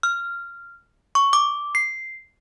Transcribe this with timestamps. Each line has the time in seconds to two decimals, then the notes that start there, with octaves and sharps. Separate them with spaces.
0.03 F6
1.15 C#6
1.33 D6
1.75 C7